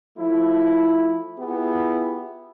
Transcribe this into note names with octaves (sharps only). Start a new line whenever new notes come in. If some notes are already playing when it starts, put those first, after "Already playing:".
F3 A3 E4
B3 E4 F4 G4 G#4